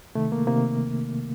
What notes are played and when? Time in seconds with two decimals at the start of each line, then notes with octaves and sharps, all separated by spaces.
0.15 C3 D#3 A3
0.32 A#3
0.47 C3 D#3 A#3